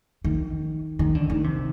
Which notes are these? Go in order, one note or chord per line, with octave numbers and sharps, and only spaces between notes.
D#3
D#3
D3
D#3
C3